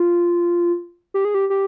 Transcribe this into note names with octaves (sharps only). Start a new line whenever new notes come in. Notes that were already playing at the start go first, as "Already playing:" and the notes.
Already playing: F4
G4
G#4
G4
G4